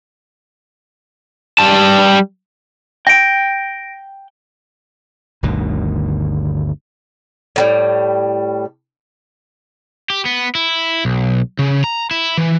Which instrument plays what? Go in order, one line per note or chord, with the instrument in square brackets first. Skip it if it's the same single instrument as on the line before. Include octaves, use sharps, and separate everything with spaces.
[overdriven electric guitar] G3 A5
[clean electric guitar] G5 [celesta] A#6 D7
[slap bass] G1 D2 B2 D#3
[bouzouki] A2 F#3 G3
[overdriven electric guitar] G4
B3
E4
B1
C#3
A#5
E4
E3